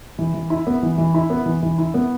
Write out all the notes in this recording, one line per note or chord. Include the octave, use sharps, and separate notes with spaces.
E3
E3
E4
B3
E3
E3
E4
B3
E3
E3
E4
B3